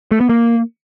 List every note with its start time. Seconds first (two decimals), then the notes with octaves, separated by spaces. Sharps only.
0.11 A3
0.20 B3
0.29 A#3